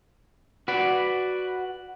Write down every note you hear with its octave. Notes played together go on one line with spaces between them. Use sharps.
F#4 B4 D5